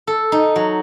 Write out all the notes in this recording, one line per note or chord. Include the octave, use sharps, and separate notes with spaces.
A4
D#4
F#3